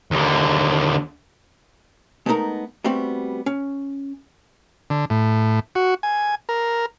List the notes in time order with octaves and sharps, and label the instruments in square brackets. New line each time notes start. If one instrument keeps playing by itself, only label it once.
[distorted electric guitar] D#2 D3
[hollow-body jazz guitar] G#3 A3 B3 C#4 D#4 A#4
G3 A3 B3 C4 F#4
C#4
[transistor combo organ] D3
A2
F#4
G#5
A#4